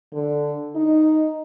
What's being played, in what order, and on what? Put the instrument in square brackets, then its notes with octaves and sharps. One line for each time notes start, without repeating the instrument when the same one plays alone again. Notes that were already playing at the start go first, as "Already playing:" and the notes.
[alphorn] D3
D#4